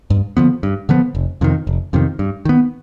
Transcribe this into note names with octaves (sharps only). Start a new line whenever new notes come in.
G2
D3 F3 B3
G2
D3 F3 B3
F1
F2 C3 D#3
F1
F2 C3 D#3
G2
D#3 B3